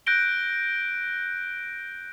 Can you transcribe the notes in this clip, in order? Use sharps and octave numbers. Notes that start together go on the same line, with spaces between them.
F#6 G6 A#6 D7 G7